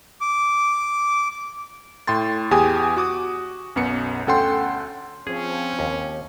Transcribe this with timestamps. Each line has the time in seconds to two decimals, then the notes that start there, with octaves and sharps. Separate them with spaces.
0.21 D6
2.07 A2 G5 C6 A6
2.51 E2 G4 G#4 G5 G#5 D#6
2.97 F#4 D6 D#6
3.76 B1 F#2 B3 C#7
4.27 D2 C#4 A4 F#5 G5 C6
5.27 F3 C4 C#4 G#4
5.79 D#2